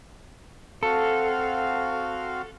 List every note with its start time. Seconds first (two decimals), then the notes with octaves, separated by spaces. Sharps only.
0.83 C4 F#4 A4 F5